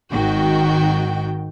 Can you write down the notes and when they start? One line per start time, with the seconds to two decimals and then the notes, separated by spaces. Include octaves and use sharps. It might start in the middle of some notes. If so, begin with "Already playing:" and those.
0.11 G#1 D#3 F#4 G5